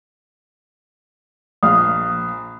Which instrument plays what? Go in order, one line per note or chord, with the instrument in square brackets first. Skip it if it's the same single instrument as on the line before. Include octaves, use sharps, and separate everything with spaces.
[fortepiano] A#1 F5 F6 [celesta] D#6